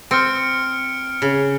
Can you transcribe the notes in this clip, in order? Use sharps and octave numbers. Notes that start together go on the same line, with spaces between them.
C4 F6 C#7 D7
C#3